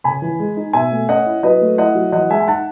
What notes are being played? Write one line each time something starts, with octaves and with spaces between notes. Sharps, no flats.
C#3 G#5 B5
E3
G#3
D#4
B2 E5 G#5
A3
C#4 D#5 F#5
E4
F#3 B4 D#5
A3
E4 D#5 F#5
F#3
E3 D#5 F#5
G#3 E5 G#5
G#5
D#4 F#5 A5